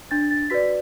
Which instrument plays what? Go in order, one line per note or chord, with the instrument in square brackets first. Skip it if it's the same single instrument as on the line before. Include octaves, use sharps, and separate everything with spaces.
[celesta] D4 A6
A6
F#4 B4 D5 B6